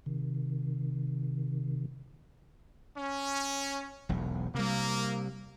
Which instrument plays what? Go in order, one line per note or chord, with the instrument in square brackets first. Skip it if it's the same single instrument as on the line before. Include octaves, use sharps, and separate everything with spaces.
[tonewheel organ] C3 D#3
[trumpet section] C#4
[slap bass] E1 B1
[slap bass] C3 G3 [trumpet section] A#3